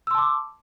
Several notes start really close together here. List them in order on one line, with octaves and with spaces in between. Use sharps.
E6 C6 A5 D6